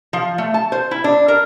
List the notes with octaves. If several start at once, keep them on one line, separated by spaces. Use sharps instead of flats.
F3
A3
A5
C5
E4
D4
A#4